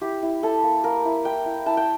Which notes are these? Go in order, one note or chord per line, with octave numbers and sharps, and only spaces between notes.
E4 G4
E4
E4 A4
A#3
A#3 A#4
E4
E4 G5
E4
E4 A5
G5